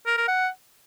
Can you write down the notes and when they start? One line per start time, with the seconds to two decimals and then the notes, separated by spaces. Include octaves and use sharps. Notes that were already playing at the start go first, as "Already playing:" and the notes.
0.06 A#4
0.17 A#4
0.28 F#5